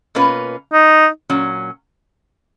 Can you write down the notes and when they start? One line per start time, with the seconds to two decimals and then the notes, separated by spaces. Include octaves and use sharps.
0.15 B2 A#3 C#4 F4 B4
0.73 D#4
1.30 A#2 F#3 C#4